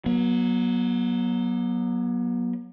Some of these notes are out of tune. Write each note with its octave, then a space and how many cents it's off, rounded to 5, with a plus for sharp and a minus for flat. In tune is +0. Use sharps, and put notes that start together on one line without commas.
F#3 +0 B3 -45